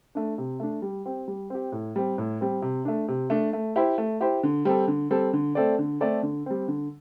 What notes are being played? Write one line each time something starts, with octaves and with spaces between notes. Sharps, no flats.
A3 D4
C3
A3 D4
G3
C4 G4
G3
C4 G4
A2
G3 C4
A2
G3 C4
C3
A3 D4
C3
A3 D4
A3
E4 G4 C5
A3
E4 G4 C5
D3
G3 C4 A4
D3
G3 C4 A4
D3
A3 C4 A4 D5
D3
A3 C4 A4 D5
D3
G3 C4
D3